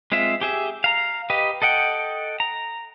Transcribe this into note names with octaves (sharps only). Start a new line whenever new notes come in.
G#3 C4 F4 E5
G4 G#4 E5
F5 A#5
G4 B4 D#5
A4 D#5 F#5 G5
A#5